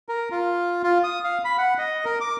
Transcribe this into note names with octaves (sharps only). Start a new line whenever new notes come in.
A#4
F4
F4
D#6
F5
B5
F#5
D#5
A#4
D6